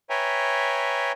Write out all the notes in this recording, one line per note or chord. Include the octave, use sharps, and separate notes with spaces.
B4 C#5 E5 G5 G#5 A#5